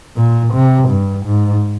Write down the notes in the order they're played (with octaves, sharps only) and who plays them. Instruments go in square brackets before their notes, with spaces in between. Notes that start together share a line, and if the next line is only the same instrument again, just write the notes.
[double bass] A#2
C3
G2
G#2